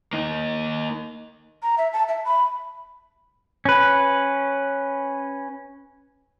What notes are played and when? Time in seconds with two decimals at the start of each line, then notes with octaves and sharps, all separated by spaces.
0.13 A#3 D#4
1.63 A#5
1.78 E5
1.93 A5
2.09 E5
2.25 B5
3.65 C#4 B4